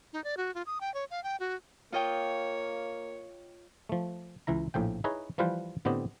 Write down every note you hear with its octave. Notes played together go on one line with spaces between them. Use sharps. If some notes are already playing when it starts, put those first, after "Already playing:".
D#4
D5
F#4
F4
D#6
G5
C#5
F5
G5
F#4
A#3 F4 C#5 D#5 G5
F3 A3
C#2 E3 E4 A#5
A#1 A2 F3 G5
D#4 E4 G#4 B4 C#5 D#5
E3 F3 G3 F4 B4 C5
A2 D3 B3 C4 G4 D#5